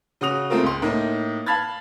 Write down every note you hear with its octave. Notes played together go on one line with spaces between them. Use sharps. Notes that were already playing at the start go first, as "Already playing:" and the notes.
C#3 F#4 D#6 F7
G#3 A3 C4 F4 A#4
C#2 C6
A2 A#3 D#4
F5 A5 B5 F6 G#6 A6